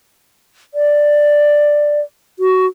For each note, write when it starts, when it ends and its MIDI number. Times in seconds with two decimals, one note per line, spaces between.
0.74 2.00 74
2.39 2.66 66